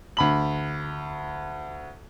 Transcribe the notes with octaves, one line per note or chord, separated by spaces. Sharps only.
D2 B5 F#7